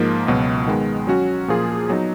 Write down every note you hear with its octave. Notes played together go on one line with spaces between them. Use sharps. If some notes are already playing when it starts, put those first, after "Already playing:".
Already playing: G#2 F3 A#3
C#2 B2 F#3
D#3 G#3 B3
F#3 C#4 F#4
A#2 F3 A#3 F4 G#4
F#3 B3 D#4